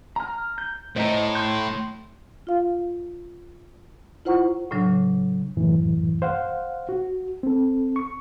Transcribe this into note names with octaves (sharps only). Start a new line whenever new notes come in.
A#5 F6
G6
A2 C5 D#5 A#5
C6 F#6 G6
F4 F5
E4 F4 C5 F#5 A#5 C#6
A2 C#3 F#3 D4
C2 F#2 A2 E3
C5 F5 F#5
F#4
C4 A4
C#6